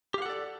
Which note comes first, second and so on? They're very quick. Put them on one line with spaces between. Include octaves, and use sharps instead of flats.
G4 F5 F#5 A4 D5